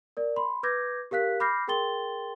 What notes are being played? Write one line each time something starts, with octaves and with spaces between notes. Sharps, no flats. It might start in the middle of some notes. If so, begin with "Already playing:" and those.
A#4 D5
B5 C6
B4 D6 G6 G#6 A#6
G4 A#4 F5 F#6 B6
B5 D6 F6 G6 A#6 C7
G#4 A#4 G5 C6 A6 G7